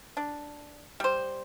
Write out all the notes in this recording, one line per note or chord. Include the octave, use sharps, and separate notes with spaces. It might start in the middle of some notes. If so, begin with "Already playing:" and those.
D4
G3 C5